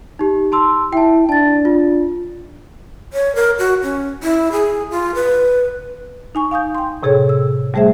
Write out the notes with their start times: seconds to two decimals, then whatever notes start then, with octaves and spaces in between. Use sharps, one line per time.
0.19 D#4 G4
0.52 A5 C6 E6
0.93 E4 G5 A5
1.29 D4 A5 A6
1.65 F4
3.13 C#5
3.35 A#4
3.59 F#4
3.83 C#4
4.23 E4
4.52 G#4
4.91 F4
5.15 B4
6.35 D#4 G#5 C#6
6.51 F5 G#5 D#6 G6
6.75 G5 C6
7.03 A2 C3 G#4 A4 C#5
7.29 E6
7.74 G3 A3 G#4 C5 E5